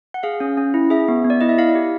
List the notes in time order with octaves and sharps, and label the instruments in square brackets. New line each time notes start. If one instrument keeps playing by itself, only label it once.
[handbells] F#5
G#4 F5
C#4
C#4
E4
G#4 E5
B3
B3
D5
E4 D#5
E5
E4 F5
G4